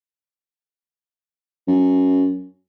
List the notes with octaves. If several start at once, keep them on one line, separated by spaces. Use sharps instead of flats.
F#2